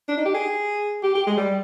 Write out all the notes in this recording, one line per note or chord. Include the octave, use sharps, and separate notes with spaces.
D4
D#4
G4
G#4
G4
G4
G#3
G3